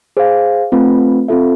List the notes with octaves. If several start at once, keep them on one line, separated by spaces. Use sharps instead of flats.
G#4 C5 F5
A3 C4 F4 B4
C4 F4 A4 E5